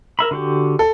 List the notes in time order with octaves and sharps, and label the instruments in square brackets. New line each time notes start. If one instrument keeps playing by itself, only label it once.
[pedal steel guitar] A#4 E5 B5
D3 F#4 G4
[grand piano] A4